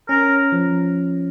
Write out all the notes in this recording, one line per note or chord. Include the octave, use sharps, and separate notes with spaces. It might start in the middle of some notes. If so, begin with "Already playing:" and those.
C#4 A#4
F3